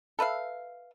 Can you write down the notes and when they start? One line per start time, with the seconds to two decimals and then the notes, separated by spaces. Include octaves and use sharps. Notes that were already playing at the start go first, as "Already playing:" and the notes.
0.19 A4 B4 E5 F5